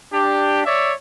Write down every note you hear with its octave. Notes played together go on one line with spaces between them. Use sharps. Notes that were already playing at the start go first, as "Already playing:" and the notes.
D4 G4
C#5 D5 E5